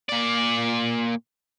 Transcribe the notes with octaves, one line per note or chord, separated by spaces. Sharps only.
A#2 D5